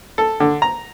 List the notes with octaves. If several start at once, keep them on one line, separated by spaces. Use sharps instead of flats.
A4
D3
A#5